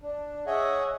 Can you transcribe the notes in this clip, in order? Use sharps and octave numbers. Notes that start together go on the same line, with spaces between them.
D4
G#4 C#5 D#5 E5 F#5